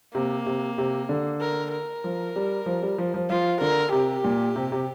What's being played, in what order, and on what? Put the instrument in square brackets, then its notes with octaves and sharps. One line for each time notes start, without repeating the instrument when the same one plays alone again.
[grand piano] C3 [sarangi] A#3
[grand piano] C3
C3
D3
[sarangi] A#4
A#4
[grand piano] F3
G3
F3
G3
F3
F3
[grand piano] F3 [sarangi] F4
[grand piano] D3 [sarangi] A#4
[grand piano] C3 [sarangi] G4
[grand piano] A#2
C3
C3